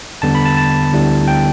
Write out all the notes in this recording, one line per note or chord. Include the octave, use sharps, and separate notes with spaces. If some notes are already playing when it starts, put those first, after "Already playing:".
E2 D3 G3 B3 A5
B5
A5
A5
D2 D3 G3 B3 E4
G5